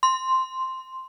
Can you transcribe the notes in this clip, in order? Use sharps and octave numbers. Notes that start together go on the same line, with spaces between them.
C6